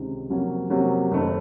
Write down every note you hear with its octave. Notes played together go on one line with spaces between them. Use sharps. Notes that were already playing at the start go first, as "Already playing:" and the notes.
Already playing: C#2 C3 D#3
F2 C3 F#3 A#3 C#4
F2 C3 F#3 A#3 C#4
F#1 F#2 D#3 A3